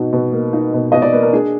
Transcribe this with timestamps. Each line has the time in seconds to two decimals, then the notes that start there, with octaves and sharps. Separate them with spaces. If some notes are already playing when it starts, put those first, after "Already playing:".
Already playing: B2 D#4 F#4
0.13 B2
0.32 A#3
0.53 D#4
0.73 B2
0.92 B2 D#5
1.02 D5
1.12 A#3 B4
1.22 A#4
1.33 D4 G#4